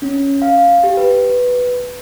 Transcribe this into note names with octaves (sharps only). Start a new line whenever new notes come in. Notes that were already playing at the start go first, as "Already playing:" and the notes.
C#4
F5
G4
B4